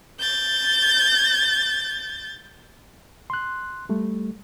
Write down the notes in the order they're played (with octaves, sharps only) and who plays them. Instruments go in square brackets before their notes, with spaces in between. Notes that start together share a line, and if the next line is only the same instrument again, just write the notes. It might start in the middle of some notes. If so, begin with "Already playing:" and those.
[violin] G6 A6
[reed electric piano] C6 F#6
G3 A3